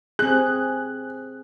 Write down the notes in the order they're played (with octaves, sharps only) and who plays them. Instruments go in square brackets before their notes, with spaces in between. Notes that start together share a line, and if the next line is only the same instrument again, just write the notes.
[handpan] C4 G#4 [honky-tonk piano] F#6